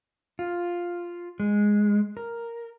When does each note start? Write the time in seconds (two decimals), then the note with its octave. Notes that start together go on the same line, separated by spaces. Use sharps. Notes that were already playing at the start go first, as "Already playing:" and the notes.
0.39 F4
1.40 G#3
2.17 A#4